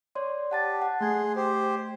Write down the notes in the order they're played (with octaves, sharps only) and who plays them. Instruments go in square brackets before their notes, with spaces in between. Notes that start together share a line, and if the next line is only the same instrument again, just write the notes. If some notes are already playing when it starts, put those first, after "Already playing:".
[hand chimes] C#5 D5 C6
[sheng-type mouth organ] G4 [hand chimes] F#5 A5 A6
[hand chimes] F#5
[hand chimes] A3 G#6 [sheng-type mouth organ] G#4 C6
[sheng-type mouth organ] G4 C5